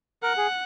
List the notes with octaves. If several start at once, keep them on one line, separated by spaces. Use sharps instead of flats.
A#4 F#5
G#4